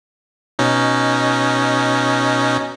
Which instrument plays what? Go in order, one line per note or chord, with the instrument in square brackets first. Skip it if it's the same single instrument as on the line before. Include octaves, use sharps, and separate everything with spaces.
[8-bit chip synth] B2 C#4 D#4